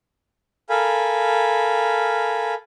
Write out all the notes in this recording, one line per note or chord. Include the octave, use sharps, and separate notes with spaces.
A4 A#4 F5 G#5 B5